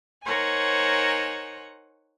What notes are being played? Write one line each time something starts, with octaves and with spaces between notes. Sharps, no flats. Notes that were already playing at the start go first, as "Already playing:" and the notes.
D#4 A#4 C5 C#5 F#5 G#5